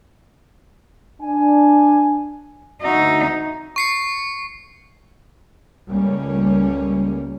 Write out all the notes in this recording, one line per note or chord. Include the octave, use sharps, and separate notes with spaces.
D4 G#5
D2 D#4 F#4 E5
C#6 C7 C#7
C#2 G3 A3 A#3 C#4